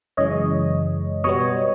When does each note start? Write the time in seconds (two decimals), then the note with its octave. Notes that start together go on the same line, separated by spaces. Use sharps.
0.17 F#2 C#3 E3 G#3 C#5 D#5
1.24 B2 G3 B3 C#5 D#5